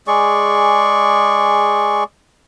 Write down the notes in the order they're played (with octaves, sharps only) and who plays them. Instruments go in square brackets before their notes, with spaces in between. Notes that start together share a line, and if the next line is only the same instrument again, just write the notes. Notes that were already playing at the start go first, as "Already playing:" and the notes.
[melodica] G#3 G#4 D5 C#6